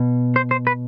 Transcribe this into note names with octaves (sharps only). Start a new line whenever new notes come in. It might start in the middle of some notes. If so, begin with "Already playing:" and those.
Already playing: B2
C5
C5
B4